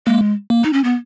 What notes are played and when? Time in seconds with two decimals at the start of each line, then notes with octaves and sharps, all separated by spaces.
0.06 G#3 A#3
0.50 A#3
0.64 D#4
0.73 C#4
0.84 B3